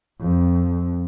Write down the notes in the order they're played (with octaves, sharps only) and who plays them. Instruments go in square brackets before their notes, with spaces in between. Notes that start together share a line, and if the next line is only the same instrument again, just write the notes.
[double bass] F2